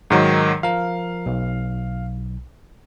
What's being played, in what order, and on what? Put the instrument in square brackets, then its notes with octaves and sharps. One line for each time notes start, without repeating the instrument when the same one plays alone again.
[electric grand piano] G#2 D#3 F#3 [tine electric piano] A#4
[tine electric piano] F3 A#4 [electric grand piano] F5
[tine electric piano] B1